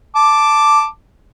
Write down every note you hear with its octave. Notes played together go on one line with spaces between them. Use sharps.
A5 D6